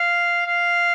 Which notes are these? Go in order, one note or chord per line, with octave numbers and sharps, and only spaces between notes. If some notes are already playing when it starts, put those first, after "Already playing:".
Already playing: F5
F5